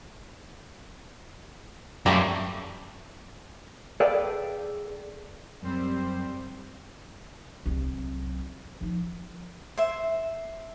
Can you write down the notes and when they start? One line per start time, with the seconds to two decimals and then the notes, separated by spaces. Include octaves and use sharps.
2.06 F#2 G3 A3 A#3
4.00 G#4 A4 B4 D5 F5 G5
5.63 F#2 G3 C4 C5
7.66 C2 F#3
8.81 F3 D#4
9.77 C5 E5